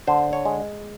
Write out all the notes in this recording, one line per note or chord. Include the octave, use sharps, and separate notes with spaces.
D3 C5
C#5
G#3